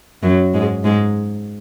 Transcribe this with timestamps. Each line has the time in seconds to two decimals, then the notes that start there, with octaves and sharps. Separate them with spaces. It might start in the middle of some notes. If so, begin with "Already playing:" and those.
0.23 F#2 F#3
0.54 G#2 G#3
0.84 G#2 G#3